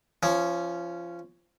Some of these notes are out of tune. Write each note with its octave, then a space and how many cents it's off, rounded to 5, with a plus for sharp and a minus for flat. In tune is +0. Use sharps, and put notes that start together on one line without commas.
F3 -20 C#4 +0